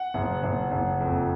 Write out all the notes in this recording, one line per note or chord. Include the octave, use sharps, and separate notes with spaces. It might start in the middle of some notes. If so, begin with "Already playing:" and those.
Already playing: F#5
F#1
F#1
F#1
F2